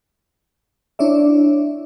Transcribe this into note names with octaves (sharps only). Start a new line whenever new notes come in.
D4 E4 C#5 D5 E5